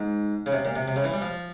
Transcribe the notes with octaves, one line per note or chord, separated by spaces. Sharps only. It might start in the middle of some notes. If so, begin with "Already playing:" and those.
Already playing: G#2
C#3
C3
A#2
C3
C3
C#3
E3
G3
F3